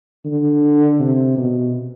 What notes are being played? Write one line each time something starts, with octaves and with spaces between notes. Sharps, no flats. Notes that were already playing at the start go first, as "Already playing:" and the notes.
D3
C3
B2